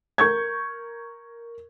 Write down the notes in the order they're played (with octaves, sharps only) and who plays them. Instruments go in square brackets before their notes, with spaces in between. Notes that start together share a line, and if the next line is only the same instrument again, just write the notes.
[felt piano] A#4 C#6 G6 G#6